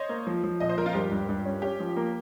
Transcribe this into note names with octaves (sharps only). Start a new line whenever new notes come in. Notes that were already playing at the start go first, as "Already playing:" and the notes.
Already playing: C5 C#5 D#5
A#3
F3
F3
A#2 D#5
C5
F3 A#4
F4
G2 G4
G2
G2
C#4
C#4 G4
F3
A#3